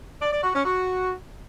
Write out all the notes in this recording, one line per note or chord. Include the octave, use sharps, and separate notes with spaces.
D5
D5
F#4
C#4
F#4